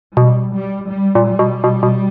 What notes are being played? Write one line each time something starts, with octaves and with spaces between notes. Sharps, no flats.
B2 G3
G3
G3
A#2
G3
B2
B2
B2